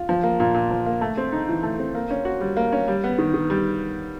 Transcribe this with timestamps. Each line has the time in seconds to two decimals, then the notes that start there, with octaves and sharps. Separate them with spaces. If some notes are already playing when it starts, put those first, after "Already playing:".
Already playing: F4
0.09 F3
0.23 A#3
0.40 A#2
0.54 A#2
0.71 F3
0.86 A#3
1.01 A3
1.17 C4
1.32 D#4
1.49 E3
1.63 A3
1.79 C4
1.95 A#3
2.10 C#4
2.25 F#4
2.41 G3
2.57 A#3
2.72 C#4
2.88 G3
3.04 B3
3.18 D#3
3.34 D#3
3.50 G3